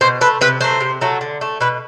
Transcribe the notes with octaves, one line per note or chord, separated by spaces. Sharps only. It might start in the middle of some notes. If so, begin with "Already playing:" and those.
B2 C5
A3 B4
C3 B4
F#3 A3 C5
C3
F#3 A3
D3
A3
B2 B4